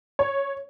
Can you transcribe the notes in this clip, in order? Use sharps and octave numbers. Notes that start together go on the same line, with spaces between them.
C#5